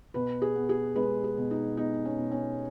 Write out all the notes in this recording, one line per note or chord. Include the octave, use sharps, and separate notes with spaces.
B2 B4
G#4
B3
G#4
G#3 B4
G#4
B2
D#4
B3 D#4
C#4
B2
C#4